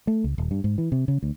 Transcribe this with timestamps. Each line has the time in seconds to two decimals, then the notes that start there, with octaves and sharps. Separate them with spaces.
0.07 A3
0.24 C#2
0.38 D#1
0.51 G2
0.64 G#2
0.78 E3
0.92 C3
1.08 C#3
1.23 D2